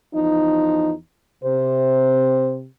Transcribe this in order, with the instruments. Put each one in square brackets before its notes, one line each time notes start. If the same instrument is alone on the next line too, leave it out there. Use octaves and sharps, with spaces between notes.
[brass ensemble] E2 F3 D#4
[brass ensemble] C3 [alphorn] C5